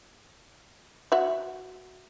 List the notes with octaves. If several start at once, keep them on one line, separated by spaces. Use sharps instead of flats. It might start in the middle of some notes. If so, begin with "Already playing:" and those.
F#4 E5